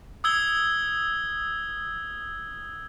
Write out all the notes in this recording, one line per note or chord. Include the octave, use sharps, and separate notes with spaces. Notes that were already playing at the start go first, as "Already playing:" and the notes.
D#6 E6 G#6 G7